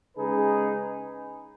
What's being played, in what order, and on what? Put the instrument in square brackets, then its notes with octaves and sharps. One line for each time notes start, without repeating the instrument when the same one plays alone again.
[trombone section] C#3 G#3 D#4 G#4 B4